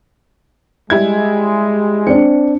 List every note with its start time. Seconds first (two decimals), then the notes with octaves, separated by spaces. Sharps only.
0.90 G3 G#3 E4 G#6
2.07 C4 D4 C#7